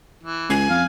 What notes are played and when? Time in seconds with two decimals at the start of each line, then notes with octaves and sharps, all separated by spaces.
0.23 E3
0.49 C#2 G#5
0.70 F2 F5